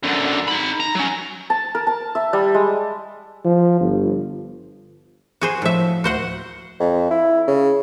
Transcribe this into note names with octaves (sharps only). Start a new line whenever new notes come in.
F#2 D3
D#4 B5
A#5
F#3 C#4
A5
A#4
A5
E5
G3
G#3
F3
G1
F#4 G#4 C5
A2 F3 E5
D2 F#4 C5 F#5
F2
E4
C#3